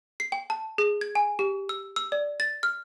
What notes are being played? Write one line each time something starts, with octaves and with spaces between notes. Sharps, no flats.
C7
G5
A5
G#4
G#6
G#5
G4
E6
E6
D5
A6
F6